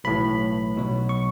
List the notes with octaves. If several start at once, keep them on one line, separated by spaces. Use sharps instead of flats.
B1 A2 E3 B5
B1 B2 F#3
C#6